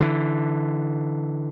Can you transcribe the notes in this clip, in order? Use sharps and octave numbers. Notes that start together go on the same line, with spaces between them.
D3 E3